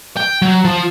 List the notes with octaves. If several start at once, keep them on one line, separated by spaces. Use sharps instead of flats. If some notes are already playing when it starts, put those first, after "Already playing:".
G5
F#3
F3